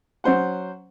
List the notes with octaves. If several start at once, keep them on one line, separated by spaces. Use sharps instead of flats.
F#3 C#4 C5 F#5